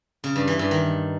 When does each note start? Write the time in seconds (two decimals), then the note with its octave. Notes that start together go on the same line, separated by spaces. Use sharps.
0.24 C#3
0.36 G2
0.47 E3
0.59 G2
0.71 D#3